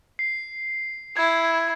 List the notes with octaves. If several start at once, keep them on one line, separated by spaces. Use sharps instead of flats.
C7
E4 G#6